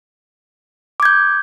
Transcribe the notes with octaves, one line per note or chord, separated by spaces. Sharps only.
D6 G6 G#6